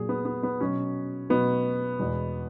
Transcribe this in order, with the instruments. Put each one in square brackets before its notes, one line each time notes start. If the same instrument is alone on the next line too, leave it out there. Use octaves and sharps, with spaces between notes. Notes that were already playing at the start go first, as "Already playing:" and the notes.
Already playing: [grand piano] A#2 F#3 G#4
B3
B3
B3
B2 F#3 C#4
B2 F#3 B3
E2 B2 G#3